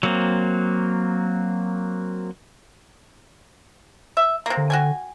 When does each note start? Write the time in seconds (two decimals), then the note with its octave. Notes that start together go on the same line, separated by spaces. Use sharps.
0.03 F#3 A#3 C4
4.17 E5
4.46 C3 A#3
4.57 D3
4.70 F#4 G5 G#5